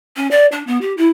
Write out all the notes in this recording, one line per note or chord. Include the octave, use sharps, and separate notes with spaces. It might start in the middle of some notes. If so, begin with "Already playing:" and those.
C#4
D5
D4
B3
G4
E4